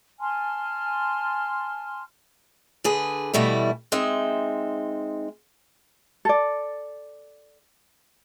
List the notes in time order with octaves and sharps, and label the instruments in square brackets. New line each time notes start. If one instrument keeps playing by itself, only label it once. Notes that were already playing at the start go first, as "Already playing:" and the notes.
[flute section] G#5 A5 C6 F6
[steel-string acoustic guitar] D3 G#4 B4
B2 E3 G3 A3 E4
G#3 C4 D#4 E5
[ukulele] A4 D5